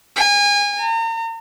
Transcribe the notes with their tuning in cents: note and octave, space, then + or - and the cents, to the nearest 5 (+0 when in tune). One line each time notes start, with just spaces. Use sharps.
G#5 -30
A#5 -40